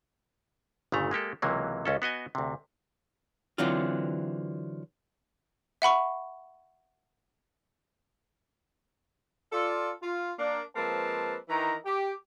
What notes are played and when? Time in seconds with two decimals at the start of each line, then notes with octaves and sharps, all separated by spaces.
0.92 G1 A#2 C#3 A3 A#5
1.11 G#3 A#3 G4 A4
1.42 C#2 C3 E3 F#3 A#3
1.85 C#2 C#4 A4
2.02 B3 F#4 D#5 G#5
2.35 D2 C3
3.58 D3 E3 F#3 C4 F4
5.82 E5 F#5 B5 C#6
9.52 F4 A4 D5
10.02 F4
10.39 A#3 D4
10.75 F3 G#3 A#3 C4 B4 A5
11.49 D#3 E3 A#5
11.86 G4